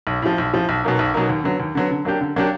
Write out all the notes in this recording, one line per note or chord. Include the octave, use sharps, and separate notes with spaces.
B1
A2 F3
B1
A2 F3
B1
B2 F#3 A#3 D#4
B1
B2 F#3 A#3 D#4
D#2
D3 F#3 B3
D#2
D3 F#3 B3
D3
F#3 A#3 D4 G4
D3
F#3 A#3 D4 G4